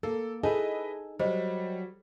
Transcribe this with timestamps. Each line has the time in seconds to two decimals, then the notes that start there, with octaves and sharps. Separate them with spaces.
0.03 A#3 A4
0.43 D#4 E4 G#4 A4 B4 D#5
1.19 F#3 G3 C5 D#5